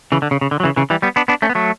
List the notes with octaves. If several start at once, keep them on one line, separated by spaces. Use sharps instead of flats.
C#3 E3
D3
C#3
C#3
D3
F#3
C#3 E3
C#3 E3
E3 G3
G3 B3
B3 D4
B3 D4
A3 C#4
B3
F#3 A3